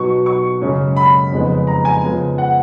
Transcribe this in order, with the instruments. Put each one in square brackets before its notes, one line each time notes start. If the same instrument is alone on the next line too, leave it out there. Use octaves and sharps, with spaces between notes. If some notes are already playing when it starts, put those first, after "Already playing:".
Already playing: [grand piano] B2 F#3 B3 D#4 C#6
C#6
F#2 C#3 G#3 C#4
B5
F2 C#3 G#3 B3 D#4
A#5
G#5
C#3 F3 G#3 B3
F#5